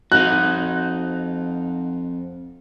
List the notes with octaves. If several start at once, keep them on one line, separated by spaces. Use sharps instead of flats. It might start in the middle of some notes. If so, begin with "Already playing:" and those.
F2 D#4 F#4 F#6